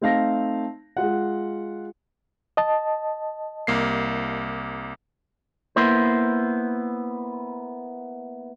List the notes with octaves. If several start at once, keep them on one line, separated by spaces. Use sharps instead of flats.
A3 C4 D#4 F5 A5 A#6
G#3 F4 F#5
D#5 A5
C2 A#3 C7
A#3 B3 E4 C5